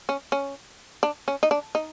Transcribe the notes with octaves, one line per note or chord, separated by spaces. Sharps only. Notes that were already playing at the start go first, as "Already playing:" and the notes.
C#4
C#4
D4
C#4
D#4
D4
D#4